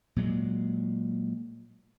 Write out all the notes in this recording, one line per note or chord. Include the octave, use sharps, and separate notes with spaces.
A#2 F#3 G#3